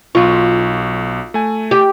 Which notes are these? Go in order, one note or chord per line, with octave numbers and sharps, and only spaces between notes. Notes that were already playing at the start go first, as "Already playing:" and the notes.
B1 F4 C#6
A3 G#5
G4